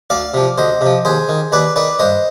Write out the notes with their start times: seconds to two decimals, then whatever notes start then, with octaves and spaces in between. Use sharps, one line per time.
0.10 D2 D5 F5
0.34 C3 F3
0.58 D2 C5 D#5
0.81 C3 F3
1.05 D#2 G#4 C5
1.29 D#3
1.52 D#2 B4 D5
1.76 D#3 B4 D5
1.99 G2 C5 D#5